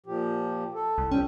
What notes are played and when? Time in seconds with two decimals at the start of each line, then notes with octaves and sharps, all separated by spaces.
0.06 A#2 F3 G4
0.74 A4
0.98 C2
1.12 F3 G3 C#4 G5